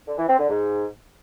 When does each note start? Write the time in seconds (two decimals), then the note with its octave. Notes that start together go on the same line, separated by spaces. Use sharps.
0.08 D3
0.18 E3
0.29 C4
0.39 D3
0.50 G#2